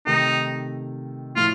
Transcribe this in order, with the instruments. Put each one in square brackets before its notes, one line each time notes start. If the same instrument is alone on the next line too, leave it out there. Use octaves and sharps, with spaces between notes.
[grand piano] C3 D#3 A3 [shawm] D#4
[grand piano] A2 F3 [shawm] F4